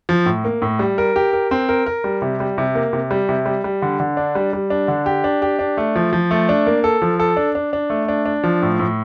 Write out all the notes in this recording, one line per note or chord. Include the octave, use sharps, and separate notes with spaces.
F3
A2
A#3
A2
G3
A#4
G4
A#4
C4
A#4
A#4
G3
C3
G3
C3
A#3
C3
G3
C3
G3
G3
D3
D3
D4
G3
G3
D4
D3
G4
D4
G4
D4
A3
F3
F3
A3
D4
A#3
A4
F3
A4
D4
D4
D4
A3
D4
D4
F3
A2
A2